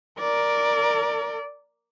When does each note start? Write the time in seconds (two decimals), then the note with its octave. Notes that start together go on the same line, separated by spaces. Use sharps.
0.19 A#4 D5